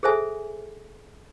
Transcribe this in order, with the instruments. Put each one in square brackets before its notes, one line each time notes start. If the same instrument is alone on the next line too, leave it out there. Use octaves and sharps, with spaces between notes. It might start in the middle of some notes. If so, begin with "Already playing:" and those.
[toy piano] G#4 A4 C5 E5 G#5